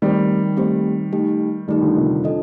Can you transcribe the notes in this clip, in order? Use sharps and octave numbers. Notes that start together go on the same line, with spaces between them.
D#3 G3 A3 C4 G4 C5
A3 C4 G4 C5
A3 D#4 G4
D#3 G3 A3 D#4 G4
D3 F3
C3 D#3
F2
D4 A4 D#5